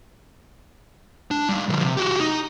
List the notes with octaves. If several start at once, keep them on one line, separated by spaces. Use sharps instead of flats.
D4
G3 D#4
D3 F3
C3
F#4 G4
D#4